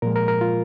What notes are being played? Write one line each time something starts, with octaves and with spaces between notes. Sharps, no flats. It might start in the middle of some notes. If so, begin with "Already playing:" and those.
A#2 F3 G#3 A#4
A#4
A#4
F4